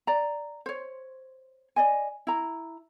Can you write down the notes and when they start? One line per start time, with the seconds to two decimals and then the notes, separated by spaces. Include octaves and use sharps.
0.07 D5 A#5
0.66 C5 C#5
1.76 D5 D#5 G#5
2.27 E4 A#5